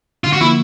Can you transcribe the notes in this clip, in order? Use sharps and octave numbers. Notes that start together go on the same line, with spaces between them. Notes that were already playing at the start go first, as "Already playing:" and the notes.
D3 F4
F#4
F3 A#3 E4